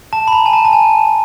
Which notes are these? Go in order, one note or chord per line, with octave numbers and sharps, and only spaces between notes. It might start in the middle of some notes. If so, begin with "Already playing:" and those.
A5
B5
A#5
G#5
A5
A5
G#5